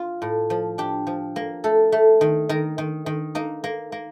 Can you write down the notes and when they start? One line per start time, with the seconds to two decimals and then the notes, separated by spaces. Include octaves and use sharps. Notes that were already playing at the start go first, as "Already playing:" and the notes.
Already playing: F4
0.22 A2
0.50 F3
0.78 D4 G4
1.07 F3
1.36 A#3
1.64 A3 A4
1.92 A3
2.21 D#3
2.49 D#3 A#4
2.78 D#3
3.06 D#3
3.35 A#3 D#4
3.64 A#3
3.92 A#3